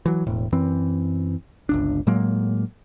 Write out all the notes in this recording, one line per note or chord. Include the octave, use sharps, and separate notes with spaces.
E3 F#3
E1 A2
F#2 E3 C4
G1 C#2 D4
A2 F#3 G#3 A#3